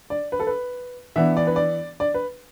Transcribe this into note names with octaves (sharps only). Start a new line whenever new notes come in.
D5
B4
A4
B4
E3 B3 D4 E5
D5
B4
D5
D5
B4